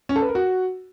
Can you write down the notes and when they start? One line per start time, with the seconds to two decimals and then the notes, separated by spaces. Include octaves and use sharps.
0.09 C#4
0.16 A4
0.22 B4
0.29 A#4
0.35 F#4